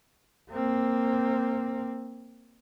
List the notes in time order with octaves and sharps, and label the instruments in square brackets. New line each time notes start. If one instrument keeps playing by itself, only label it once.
[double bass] A#3 C4